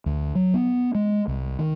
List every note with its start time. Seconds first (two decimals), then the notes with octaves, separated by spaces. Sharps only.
0.06 D2
0.35 F#3
0.54 B3
0.95 G#3
1.28 C2
1.59 D#3